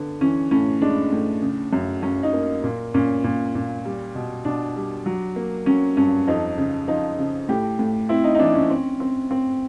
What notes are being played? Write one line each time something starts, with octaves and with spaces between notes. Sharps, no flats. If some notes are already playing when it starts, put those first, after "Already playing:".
Already playing: D3 B3
E3 C#4
A2 C#4
G#3 D4
A2
C#3
F#2
F#2 C#4
D#4
A#3
A#2
A#2 C#4
A#2
A#2
G3
B2
B2 D4
G3
F#3
A#3
F#3 C#4
G2 C#4
F2 D#4
C#3
F3 D#4
C#3
A2 G4
A2
C4 E4
D#4
D#4
E3 D4
C#4
C4
C4
C4